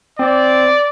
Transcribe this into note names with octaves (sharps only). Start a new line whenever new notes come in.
C4 D5